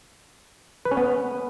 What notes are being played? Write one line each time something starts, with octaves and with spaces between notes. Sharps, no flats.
B4
C#4
B3